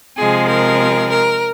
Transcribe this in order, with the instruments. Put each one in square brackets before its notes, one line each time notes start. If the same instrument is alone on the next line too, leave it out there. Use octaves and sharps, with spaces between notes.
[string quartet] C3 F3 G#3 G#4
A#4
A#4